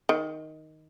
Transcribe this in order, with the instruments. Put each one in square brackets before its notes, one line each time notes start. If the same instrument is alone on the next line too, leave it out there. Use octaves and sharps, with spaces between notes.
[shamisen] D#3